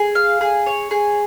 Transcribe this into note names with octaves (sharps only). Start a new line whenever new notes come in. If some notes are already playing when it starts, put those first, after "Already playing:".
Already playing: G#4
F5
G#4
C#5
G#4